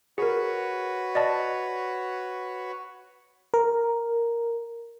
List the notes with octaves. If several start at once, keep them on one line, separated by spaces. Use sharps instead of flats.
F#4 G#4 A#4 B4 C#5
D5 D#5 A5
A#4